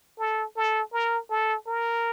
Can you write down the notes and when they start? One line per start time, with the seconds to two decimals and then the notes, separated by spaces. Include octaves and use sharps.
0.19 A4
0.56 A4
0.93 A#4
1.30 A4
1.67 A#4